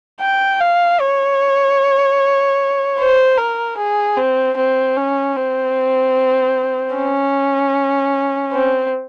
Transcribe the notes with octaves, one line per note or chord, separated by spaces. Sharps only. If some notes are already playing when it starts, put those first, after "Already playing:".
G5
F5
C#5
C5
A#4
G#4
C4
C4
C#4
C4
C#4
C4